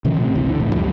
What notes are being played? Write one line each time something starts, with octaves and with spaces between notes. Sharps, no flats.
B2 D#3 F3 C#4
A2 C3
G#1 D2 C3 E3
D3
E1 A2
C#2 F#2 F3 G3